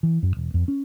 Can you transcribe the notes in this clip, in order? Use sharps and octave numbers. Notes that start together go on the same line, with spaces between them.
E3
F#2
E1
F2
C#4